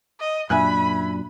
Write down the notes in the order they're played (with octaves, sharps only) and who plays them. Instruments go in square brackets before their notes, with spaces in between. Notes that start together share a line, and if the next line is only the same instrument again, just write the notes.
[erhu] D#5
[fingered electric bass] F#2 A#2 D4 [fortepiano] E5 G#5 F#6 [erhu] B5